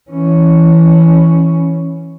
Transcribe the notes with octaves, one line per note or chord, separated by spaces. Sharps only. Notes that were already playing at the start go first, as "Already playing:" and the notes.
E3 C#4